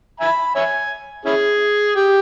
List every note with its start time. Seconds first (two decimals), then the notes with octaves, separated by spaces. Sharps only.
0.20 E5 G#5 B5
0.55 C#5 E5 G#5
1.25 C#4 E4 G#4
1.95 G4